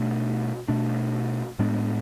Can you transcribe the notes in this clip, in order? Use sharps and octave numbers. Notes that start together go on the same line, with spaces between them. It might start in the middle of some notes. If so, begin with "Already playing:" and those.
Already playing: B2 A3 D4
B2 A3 D4
A2 G#3 B3 D4